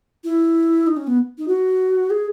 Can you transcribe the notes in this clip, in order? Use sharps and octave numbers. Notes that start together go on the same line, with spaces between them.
E4
D#4
C#4
B3
D#4
F#4
G#4